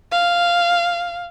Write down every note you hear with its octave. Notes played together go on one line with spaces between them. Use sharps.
F5